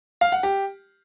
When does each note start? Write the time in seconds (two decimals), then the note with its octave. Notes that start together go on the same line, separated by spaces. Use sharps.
0.21 F5
0.32 F#5
0.43 G4